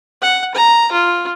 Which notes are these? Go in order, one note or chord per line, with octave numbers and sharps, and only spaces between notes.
F#5
A#5
F4